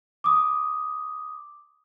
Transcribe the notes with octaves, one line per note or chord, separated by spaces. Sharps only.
D6 D#6